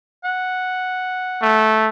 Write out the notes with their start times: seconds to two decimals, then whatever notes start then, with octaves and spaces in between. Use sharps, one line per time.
0.24 F#5
1.42 A3